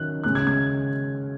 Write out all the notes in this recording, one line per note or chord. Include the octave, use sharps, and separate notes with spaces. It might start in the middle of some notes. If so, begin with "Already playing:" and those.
Already playing: D#3 F#3 C#4 F#6
C#3 G#3 C#4 F#6
G#6
G#6